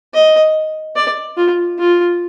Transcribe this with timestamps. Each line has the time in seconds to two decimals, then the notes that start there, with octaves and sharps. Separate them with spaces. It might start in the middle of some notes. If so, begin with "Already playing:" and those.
0.13 D#5
0.96 D5
1.37 F4
1.78 F4